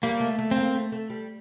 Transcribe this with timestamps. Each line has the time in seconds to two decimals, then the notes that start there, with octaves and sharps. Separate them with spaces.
0.03 G3 A#3
0.20 A3
0.39 A3
0.51 C4
0.56 A#3
0.75 A3
0.92 A3
1.10 G3